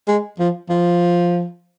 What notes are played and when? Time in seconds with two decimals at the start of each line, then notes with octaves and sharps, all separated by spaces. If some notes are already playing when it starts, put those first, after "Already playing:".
0.08 G#3
0.40 F3
0.70 F3